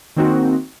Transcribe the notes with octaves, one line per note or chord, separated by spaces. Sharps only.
D#3 A#3 C4 D#4 F#4